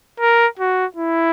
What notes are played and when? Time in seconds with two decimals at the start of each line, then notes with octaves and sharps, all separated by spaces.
0.20 A#4
0.59 F#4
0.96 E4